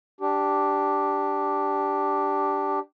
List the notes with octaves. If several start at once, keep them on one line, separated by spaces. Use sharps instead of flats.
D4 G4